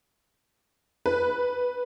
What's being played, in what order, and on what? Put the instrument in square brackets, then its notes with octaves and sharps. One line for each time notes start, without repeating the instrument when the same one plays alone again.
[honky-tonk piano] B4